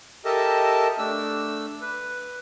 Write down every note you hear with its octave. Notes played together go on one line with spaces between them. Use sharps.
G4 A4 A#4 D#5 E5 A5
A3 D4 E6
B4